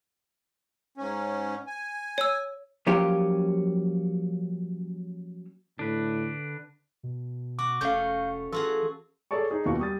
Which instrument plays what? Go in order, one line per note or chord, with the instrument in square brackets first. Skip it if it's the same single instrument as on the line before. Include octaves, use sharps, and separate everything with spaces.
[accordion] G#2 C#4
G#5
[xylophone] C#5 E6
[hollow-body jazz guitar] F3 F#3 A#3 C#4 F4 G4
[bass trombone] A2 [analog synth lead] D3 [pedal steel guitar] D4 B4
[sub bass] B2
[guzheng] F#4 [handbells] D6
[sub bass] F1 [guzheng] A3 C#4 [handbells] F5 G6
[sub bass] E3 [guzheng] F4 F#4 G#4 [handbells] A4
[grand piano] G#4 A4 C#5 D5 A5 C#6
D#4 G#4
D#2 B2 E3 F4 F#4 C#6
G3 D#6 A6